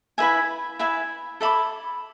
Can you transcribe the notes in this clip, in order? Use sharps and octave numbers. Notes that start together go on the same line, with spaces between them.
E4 B4 E5 G#5
E4 B4 E5 G#5
A4 E5 B5 D6